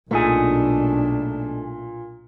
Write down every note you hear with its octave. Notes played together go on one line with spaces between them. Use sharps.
B1 A#2 A3 D4 D#4 G#4